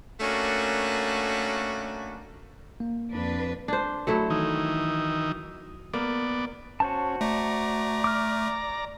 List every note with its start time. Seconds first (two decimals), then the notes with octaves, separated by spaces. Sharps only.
0.21 A3 A#3 C#4 D4 F#4
2.80 A#3
3.10 F2 D4 B4
3.68 D4 C5
4.07 F#3 A3 E4
4.30 D#3 E3 D#4
5.93 A#3 B3 D5
6.80 C#4 F#4 C5 A5
7.21 A3 D5 A#5
8.04 D6 F6